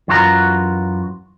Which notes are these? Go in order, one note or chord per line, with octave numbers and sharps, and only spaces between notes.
F#2 E3 F4 F#4 A#4 A#5